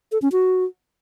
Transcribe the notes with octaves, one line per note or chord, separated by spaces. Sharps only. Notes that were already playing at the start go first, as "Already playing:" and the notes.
A4
C#4
F#4